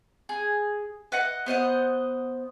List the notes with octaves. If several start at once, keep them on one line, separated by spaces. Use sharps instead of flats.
G#4
B4 D#5 F#5
B3 C5 D#5 F#5